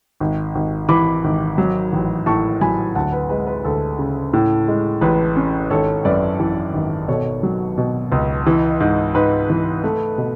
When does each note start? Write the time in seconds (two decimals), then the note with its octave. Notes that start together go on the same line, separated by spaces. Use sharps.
0.20 G#1
0.55 G#1
0.89 E3 B5 D6
1.24 G#1
1.58 F#3
1.92 A1
2.26 A2 A5 C#6
2.61 F#3 G#5 B5
2.95 D2 F#5 A5
3.12 B4
3.29 G#3 B4
3.47 B4
3.64 D2 A4
3.99 C#3
4.33 A2
4.68 G#3
5.01 A1 B4
5.36 C#4
5.70 G#1 A4 C#5
6.05 F#2 B4 D5
6.40 E3
6.73 G#1
7.08 B2 A4 C#5
7.43 F#3
7.78 B2
8.12 C#2
8.46 E3
8.80 G#2
9.14 G#2 B4
9.50 E3
9.84 A3
10.18 B2